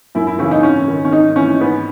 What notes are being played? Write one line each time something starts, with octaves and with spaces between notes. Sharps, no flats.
F#2 E4
E4
C#3 E3 C#4
D#4
G#2 C#4
D#3
C#4
G#2 D#4
E3 C#4
G#2 B3